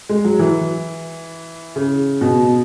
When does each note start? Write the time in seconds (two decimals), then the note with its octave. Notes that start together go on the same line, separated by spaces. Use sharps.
0.09 G#3
0.25 F#3
0.39 E3
1.76 C#3
2.21 B2